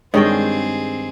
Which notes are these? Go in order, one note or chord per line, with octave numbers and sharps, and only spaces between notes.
G2 D#3 G#3 C4 G#4 C#5 D#5 G5